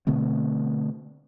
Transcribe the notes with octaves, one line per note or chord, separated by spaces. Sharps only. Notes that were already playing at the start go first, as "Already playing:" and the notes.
B2 D3 A3 C4